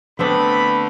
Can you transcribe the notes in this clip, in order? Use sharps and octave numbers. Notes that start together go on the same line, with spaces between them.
D3 A3 B3 C4 D4 B5